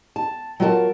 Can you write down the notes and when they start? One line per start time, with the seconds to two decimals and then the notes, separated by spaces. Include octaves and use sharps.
0.16 A5
0.60 F#3 F4 F#4 A#4 A5